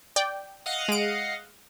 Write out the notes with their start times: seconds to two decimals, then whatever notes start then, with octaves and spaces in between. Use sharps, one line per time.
0.16 D5 G5
0.66 D#5 F5 F#5
0.88 G#3 D7